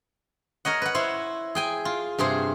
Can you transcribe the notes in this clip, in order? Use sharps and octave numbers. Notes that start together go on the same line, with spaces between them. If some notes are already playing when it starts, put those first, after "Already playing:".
A#4 C#5 D#5 F#5
B4 F#5
E4 C5 C#5
G#4 G5 G#5
F4
G2 C3 G#4 C5